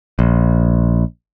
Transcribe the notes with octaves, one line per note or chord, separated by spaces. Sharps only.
A#1